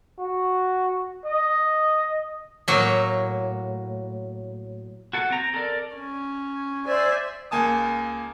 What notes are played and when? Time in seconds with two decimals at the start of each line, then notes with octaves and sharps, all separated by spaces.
0.19 F#4
1.25 D#5
2.68 A2 F#3 A#3
5.13 F#4 A4 F#5
5.30 C4 A#5
5.54 A4 A#4 D5
5.96 C#4
6.85 C5 D5 E5 G#5
7.51 C#2 A#3 G#5 A5 D#6